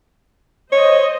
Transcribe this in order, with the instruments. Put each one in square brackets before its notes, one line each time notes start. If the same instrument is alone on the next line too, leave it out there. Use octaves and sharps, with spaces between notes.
[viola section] C5 D#5 [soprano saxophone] C#5